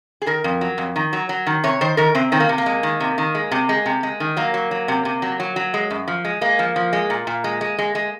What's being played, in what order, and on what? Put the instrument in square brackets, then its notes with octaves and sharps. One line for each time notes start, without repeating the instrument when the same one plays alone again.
[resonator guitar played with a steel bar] G#4
D#3 A#4
F2
F#3
F2
D#3
F#3
F#3
D#3
C3 C#5
D#3 C5
D#3 A#4
C3 C4
D#3 C4
A#3
C3
A#3
G#3
D#3
C3
D#3
G#3
C3
G#3
C3
G#3
D#3
F#3 A#3
F#3
F#3
C3
C3
F#3
F#3
F#3
G#3
F#2
F3
G#3
G#3 A#3
F3
F3
G#3
A#2
A#2
G#3
G#3
G#3
G#3